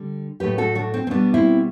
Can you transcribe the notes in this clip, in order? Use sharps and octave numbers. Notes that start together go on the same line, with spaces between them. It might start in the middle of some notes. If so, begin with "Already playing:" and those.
Already playing: D3 G3
A2 F#3 A3 G4 B4
F#4 A4
D4 F#4
C4
C4
B2 G3 B3 D4
C4 E4